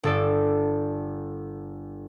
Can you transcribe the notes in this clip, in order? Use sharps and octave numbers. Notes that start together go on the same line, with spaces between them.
G1 A4 D5